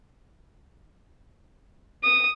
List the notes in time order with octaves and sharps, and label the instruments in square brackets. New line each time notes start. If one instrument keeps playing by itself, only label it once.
[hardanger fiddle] D#6